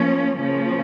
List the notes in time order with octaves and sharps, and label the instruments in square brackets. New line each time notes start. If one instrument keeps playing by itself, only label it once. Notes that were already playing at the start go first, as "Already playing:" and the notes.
Already playing: [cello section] F3 A#3 C#4
C#3 F3 A#3 C#4